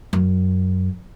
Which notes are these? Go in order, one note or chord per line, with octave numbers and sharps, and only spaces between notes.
F#2